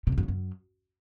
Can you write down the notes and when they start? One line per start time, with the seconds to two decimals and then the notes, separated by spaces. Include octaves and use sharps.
0.07 C3
0.12 E2
0.18 F#2
0.23 C#3
0.28 F#2